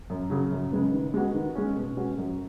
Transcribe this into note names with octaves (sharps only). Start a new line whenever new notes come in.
F#2
C#3 F#3
F#2
C#3 G#3 B3
D#3
G#3 B3 F#4
D#3
G#3 C#4
B2
G#3 C#4 F#4
F#2